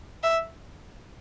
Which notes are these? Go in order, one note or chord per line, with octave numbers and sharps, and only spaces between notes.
E5